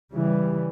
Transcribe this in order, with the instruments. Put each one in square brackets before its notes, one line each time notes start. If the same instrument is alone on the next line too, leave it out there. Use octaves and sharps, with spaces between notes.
[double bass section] C#3 E3 G3